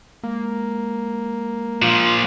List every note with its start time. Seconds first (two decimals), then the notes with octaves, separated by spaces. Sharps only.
0.24 G#3 A#3
1.82 A#2 F3 F4